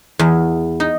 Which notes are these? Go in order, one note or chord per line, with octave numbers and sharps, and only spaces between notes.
E2
D#4